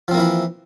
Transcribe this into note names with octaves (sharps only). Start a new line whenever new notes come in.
E3 F3 A#3 C4 E4